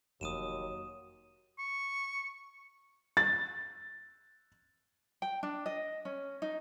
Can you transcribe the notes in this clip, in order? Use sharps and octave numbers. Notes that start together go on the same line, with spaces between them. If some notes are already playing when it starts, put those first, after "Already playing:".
F1 D#2 F#3 D#6 D#7 E7
C#6
A6
G5
D4
D#5
C#4
D#4